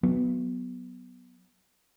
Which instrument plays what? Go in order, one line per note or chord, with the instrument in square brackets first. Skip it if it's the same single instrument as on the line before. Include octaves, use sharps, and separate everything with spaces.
[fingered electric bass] F#3 B3